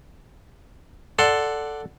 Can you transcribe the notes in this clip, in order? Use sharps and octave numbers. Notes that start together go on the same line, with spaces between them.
A4 D5 F#5 C6